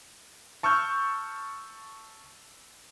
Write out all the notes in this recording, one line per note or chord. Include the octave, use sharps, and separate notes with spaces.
A5 C#6 E6 F6 G6